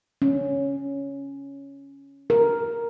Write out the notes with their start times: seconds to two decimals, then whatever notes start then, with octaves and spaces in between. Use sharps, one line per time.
0.22 C#4
2.30 A#4